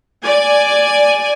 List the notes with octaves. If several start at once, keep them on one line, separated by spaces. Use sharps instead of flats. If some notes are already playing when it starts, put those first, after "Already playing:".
D5 G#5